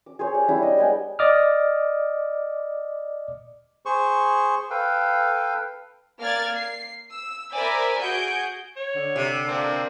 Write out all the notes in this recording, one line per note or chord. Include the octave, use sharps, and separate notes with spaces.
D6
G#4 C5 C#5
G4 C#5 D5
G3 D4 E4 D6
D#5
G#3 B3 G5 G#5
D5 D#5 D6 D#6 F6
G#4 C5 C#6
A4 B4 F5 G5
A#3 D5 F6 G#6 A6
C7
E6
A#4 C5 D5 E5 G#5 B5
F#4 G#4 G6 D7
C#5
D3
C3
A#3 C4 D4